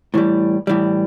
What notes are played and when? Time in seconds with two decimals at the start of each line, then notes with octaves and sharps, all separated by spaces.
0.14 A2 E3 G3
0.67 A2 E3 G3